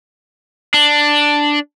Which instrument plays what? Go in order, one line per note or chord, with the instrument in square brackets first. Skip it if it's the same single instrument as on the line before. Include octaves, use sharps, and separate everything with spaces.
[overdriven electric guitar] D4